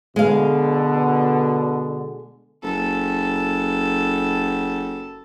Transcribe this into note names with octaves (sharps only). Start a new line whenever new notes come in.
B2 D3 G#3 F5
F#1 A4